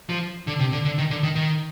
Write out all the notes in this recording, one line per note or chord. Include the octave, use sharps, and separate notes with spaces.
F3
D3
C3
D3
D3
D#3
D3
D#3
D#3